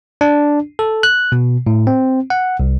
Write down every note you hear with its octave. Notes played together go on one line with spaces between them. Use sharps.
D4
A4
F#6
B2
A2
C4
F#5
C2